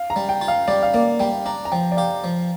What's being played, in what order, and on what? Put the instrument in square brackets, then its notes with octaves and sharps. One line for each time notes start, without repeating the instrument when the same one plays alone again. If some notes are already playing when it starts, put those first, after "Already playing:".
Already playing: [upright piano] F5
A#5
[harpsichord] G3
[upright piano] G5
[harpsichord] F4
[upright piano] F5
[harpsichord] G3 [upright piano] D5
[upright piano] F5
[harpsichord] A#3 [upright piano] D5
[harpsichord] G3 [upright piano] G5
[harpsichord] D4 [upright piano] A#5
[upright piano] A#5
[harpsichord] F3 [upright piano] G5
[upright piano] D5
[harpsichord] G4 [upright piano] F5
[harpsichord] F3